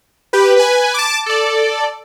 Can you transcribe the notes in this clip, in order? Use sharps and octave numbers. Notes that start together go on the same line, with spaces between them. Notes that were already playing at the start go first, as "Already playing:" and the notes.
G4 B4
B4 G#5
A5 D6
A4 D5